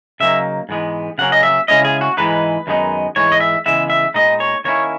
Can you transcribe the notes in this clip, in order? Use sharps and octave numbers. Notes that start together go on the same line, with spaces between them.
C#3 F#3 A#3 D#4 E5
G#2 E3 G#3 B3
C#3 F#3 A#3 C#4 F#5
D#5
E5
C#3 G#3 C#4 E4 D#5
G#4
F#4
G#2 E3 G#3 D#4 B4
F#2 D#3 G#3 B3 D#4
G#2 E3 G#3 C#5
D#5
E5
C#3 E3 G#3 B3 E5
E5
A#2 G#3 B3 D#4 D#5
C#5
D#3 A#3 C#4 E4 C#5